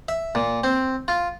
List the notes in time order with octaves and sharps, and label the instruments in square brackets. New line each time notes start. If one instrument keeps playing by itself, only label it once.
[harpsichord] E5
A#2
C4
F4